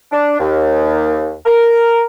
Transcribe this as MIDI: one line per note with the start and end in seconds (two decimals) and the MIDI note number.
0.11 0.36 62
0.38 1.33 39
1.46 2.03 70